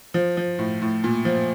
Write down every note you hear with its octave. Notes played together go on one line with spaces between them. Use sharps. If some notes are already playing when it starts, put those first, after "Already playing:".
F3
F3
A2
A2
A#2
F3